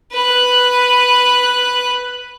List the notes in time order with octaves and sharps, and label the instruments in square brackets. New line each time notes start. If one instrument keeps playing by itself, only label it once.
[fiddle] B4 F#6